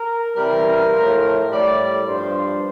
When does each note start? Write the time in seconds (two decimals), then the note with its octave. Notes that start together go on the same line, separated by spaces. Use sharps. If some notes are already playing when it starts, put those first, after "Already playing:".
Already playing: A#4
0.34 C3 E3 G3 A#4
0.92 A2 F3
1.49 A2 G3 D5
2.07 G2 F3 C5